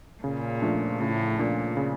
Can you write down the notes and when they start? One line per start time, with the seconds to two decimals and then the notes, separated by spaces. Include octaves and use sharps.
0.23 A#2 C#3
0.62 F3 A3 D4
1.00 A2 C#3
1.38 A#2 F3 A3 D4
1.77 C#3